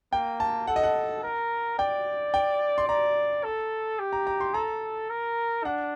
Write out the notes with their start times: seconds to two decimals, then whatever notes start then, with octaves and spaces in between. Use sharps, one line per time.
0.13 A#3 G5
0.40 A5
0.67 A4 F#5
0.76 D#5
0.83 F#5
1.23 A#4
1.79 D5 G5
2.34 G5
2.78 C6
2.88 D5 A#5
3.44 A4
3.99 G4
4.13 A#5
4.27 A#5
4.40 C6
4.54 A4 A#5
5.10 A#4
5.65 D4 F#5